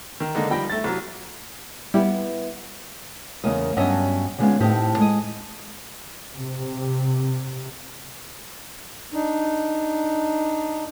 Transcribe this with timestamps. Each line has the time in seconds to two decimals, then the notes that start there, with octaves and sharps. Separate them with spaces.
0.20 D#3
0.35 D3 G#3 A#3 D#4
0.50 F3 G3 G5 B5 A#6
0.70 A3 A6
0.84 C2 F#3
1.94 G3 B3 E4
3.44 E2 C#3 A#3 A#4 D#5
3.77 G2 F#3 B3 C#4 D#5 E5
4.38 D3 G3 G#3 B3 C#4 F4
4.60 A2 C4 D#4 G4
4.98 G#3 D#5
6.37 C3
9.14 D4 D#4